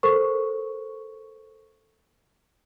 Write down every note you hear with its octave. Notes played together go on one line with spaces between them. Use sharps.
A4 A#4 C5 C#6